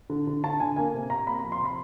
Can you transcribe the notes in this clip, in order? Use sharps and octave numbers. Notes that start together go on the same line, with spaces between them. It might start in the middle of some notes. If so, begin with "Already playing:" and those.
D3
D3
D3 A5
D3 G#5
A#3 G#5
C3
C3 A#5
A#3 B5
F3 A#5
C6
C3 B5